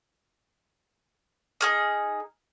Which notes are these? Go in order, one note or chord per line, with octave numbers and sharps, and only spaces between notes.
D#4 G#4 F6